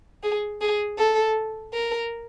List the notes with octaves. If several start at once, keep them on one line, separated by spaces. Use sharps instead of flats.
G#4
G#4
A4
A#4